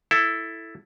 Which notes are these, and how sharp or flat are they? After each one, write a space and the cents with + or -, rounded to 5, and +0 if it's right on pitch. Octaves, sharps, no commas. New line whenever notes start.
E4 +0 A4 +0